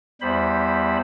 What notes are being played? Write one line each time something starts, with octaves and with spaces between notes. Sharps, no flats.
E2 G3 C5 B5